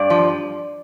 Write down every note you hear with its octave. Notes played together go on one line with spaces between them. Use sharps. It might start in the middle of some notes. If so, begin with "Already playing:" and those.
Already playing: G2 D5
F3